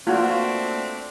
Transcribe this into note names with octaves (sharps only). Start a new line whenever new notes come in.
A3 A#3 C4 D4 F4 F#4